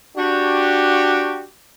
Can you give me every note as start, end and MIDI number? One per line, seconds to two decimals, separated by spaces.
0.17 1.45 62
0.17 1.45 66
0.17 1.45 67